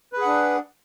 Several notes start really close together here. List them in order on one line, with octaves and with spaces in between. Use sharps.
B4 G#4 F#5 D4